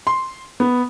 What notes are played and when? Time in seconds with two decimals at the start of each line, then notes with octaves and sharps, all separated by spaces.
0.07 C6
0.60 B3